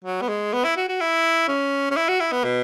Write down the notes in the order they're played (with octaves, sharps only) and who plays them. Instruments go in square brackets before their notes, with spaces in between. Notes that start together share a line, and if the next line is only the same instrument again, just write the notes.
[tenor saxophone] F#3
B3
G#3
B3
E4
F#4
F#4
E4
C#4
C#4
E4
F#4
E4
B3
B2